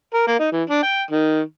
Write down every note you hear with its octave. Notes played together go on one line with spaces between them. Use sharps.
A#4
A#3
D#4
E3
D4
G5
D#3